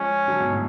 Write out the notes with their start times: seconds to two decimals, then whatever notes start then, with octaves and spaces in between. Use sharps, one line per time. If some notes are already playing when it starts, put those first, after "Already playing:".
Already playing: F3 G#3 C#4
0.28 D3 F#3
0.40 G#2 B2
0.53 A2